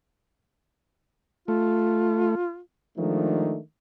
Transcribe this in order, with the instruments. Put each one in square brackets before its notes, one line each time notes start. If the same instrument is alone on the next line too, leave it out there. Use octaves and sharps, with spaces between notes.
[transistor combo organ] A3 [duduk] F4
[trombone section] D#3 F3 G#3 A3 D4 D#4